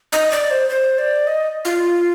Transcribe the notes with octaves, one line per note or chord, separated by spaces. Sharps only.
D#5
D5
C5
C5
D5
D#5
F4